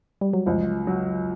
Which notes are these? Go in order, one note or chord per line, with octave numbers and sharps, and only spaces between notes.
G3
F#3
C#2 F3
F#3